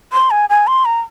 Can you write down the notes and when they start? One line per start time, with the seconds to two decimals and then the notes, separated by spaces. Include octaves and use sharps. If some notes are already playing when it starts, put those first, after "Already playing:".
0.12 C6
0.31 G#5
0.50 G#5
0.67 C6
0.85 A#5